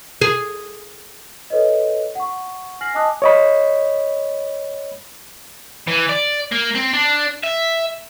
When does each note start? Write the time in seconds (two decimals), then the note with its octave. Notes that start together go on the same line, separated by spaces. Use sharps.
0.21 G#4
1.50 A4 B4 C#5 D#5
2.15 F#5 C#6
2.81 G#5 F6 A#6 C7 F#7
2.94 D#5 G#5 A5 D6 D#6 F#6
3.22 C#5 D#5 B5
5.87 E3
6.09 D5
6.52 A#3
6.75 C4
6.93 D4
7.43 E5